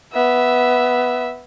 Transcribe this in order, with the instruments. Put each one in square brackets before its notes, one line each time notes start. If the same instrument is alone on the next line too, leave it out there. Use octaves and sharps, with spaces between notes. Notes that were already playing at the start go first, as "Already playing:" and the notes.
[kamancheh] B3 E5